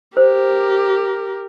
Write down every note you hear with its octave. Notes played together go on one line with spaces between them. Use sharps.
G4 A#4 C5